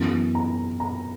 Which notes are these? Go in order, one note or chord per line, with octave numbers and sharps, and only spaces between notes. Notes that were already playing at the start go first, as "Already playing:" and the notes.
Already playing: F#2 E3 B3
A#5
A#5